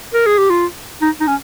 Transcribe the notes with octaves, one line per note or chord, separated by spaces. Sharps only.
A#4
G#4
G4
F4
D#4
D#4
C#4